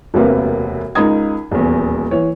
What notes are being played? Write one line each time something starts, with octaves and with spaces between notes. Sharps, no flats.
E1 D2 C3 A#3 B4
C#2 D#4 A#4 D#6 G#6
D#1 E2
E3 C#5